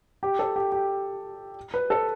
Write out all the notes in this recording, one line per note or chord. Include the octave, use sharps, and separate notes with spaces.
G4
A4
G4
G4
B4
A4